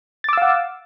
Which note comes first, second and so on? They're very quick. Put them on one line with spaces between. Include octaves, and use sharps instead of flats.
A6 D6 E6 F5 F#5